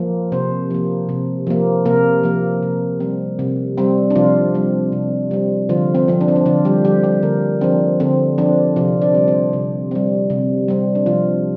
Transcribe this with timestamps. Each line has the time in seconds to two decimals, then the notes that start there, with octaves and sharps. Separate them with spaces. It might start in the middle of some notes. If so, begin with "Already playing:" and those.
Already playing: F3 A#3
0.32 C3 C4 C5
0.70 F3 A#3
1.09 C3
1.47 F3 A#3
1.85 C3 A#3 A#4
2.24 F3 A#3
2.62 C3
3.00 G3 C4
3.39 C3
3.78 G3 C4
4.10 D4
4.15 C3 F3 F4
4.54 G3 C4
4.92 C3
5.31 G3 C4
5.69 D3 F3 F4
5.95 C4
6.08 F3 C4
6.21 D4
6.28 C4
6.36 D4
6.46 D3 F3 F4
6.65 G3 G4
6.85 F3 G3 C4 G4
7.04 G3 G4
7.22 D3 A#3 A#4
7.61 F3 C4 D4
8.00 D3 C4
8.38 F3 C4 D4
8.76 C3 F3 F4
9.02 D4 D5
9.15 G3 C4
9.28 C4 C5
9.53 C3
9.91 G3 C4
10.30 C3
10.68 G3 C4
10.95 D4
11.06 C3 F3 F4